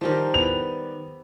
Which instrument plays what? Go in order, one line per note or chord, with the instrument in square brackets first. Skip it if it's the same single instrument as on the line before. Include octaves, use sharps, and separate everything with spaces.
[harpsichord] D#3 G3 [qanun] F3 G4 A#4
[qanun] B3 [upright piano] F7